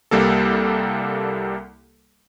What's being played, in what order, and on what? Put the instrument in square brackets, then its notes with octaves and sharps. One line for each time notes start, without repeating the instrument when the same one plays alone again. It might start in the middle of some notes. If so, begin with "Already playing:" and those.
[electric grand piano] C2 G3 A#3 A4